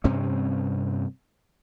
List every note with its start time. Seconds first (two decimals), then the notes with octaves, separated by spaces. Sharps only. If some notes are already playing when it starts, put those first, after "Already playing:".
0.04 G2 C3 C4 C#4